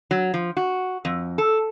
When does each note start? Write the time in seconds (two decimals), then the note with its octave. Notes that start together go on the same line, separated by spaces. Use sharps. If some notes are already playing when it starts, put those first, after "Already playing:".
0.11 F#3
0.34 F3
0.57 F#4
1.05 F2
1.38 A4